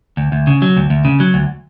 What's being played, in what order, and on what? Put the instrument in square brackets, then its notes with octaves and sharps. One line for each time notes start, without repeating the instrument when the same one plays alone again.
[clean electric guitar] D2
D2
C#3
F#3
D2
D2
C#3
F#3
D2